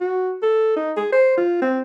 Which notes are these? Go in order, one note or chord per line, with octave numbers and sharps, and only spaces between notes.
F#4
A4
D#4
G#4
C5
F4
C4